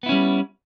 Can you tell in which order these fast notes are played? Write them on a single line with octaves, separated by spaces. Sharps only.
B3 E4 C#4 G3